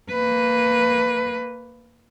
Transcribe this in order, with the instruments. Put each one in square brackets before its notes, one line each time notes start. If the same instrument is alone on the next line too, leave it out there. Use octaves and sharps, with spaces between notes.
[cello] A#3 B4